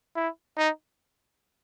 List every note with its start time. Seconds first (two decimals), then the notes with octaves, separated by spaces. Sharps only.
0.16 E4
0.57 D#4